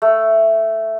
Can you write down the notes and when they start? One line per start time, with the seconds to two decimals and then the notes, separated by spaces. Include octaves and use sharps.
0.02 A3